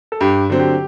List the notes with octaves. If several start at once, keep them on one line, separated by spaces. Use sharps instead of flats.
A4
G2 G4
D3 F#3 C4
G4